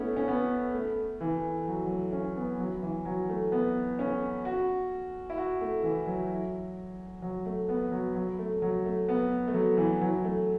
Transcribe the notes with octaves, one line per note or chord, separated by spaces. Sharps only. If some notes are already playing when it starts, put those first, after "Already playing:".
Already playing: A3 B3 C#4 E4
C#4
B3
A3
E3
F#3
F#3
A3
C#4
B3
F#3
E3
F#3
A3
B3
C#4
F#4
E4
F#4
A3
E3
F#3
F#3
A3
B3
F#3
F#3
A3
F#3
A3
B3
A3
F#3
E3
F#3
A3